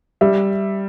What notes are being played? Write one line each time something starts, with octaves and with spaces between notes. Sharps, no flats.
G3 E5